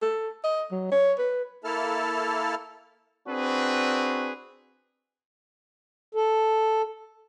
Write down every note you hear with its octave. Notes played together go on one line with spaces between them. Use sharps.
A4
D#5
F#3
C#5
B4
A#3 E4 A4 A5 F6
C4 D4 F#4 G#4 B4
A4